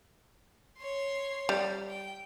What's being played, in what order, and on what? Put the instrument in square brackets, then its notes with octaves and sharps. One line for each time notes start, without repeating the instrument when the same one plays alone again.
[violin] C#5 C6
[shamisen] G3
[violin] G5